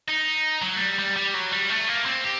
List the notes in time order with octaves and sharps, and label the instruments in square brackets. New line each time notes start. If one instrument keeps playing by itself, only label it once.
[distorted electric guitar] D#4
F#3
A3
G3
G3
G3
F#3
G3
A3
A#3
C4
G4